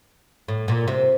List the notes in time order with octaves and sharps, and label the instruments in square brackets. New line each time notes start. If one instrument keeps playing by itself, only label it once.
[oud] A2
A#2
C3